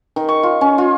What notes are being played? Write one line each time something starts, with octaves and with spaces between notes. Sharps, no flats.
D#3
C#6
F4
C#4
F4